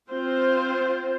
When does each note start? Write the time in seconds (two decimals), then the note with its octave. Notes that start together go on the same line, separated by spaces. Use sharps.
0.10 C4 F4 C5